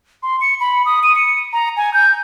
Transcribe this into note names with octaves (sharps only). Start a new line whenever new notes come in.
C6
C#7
B5
D#6
D#7
C#7
A#5
G#5
G6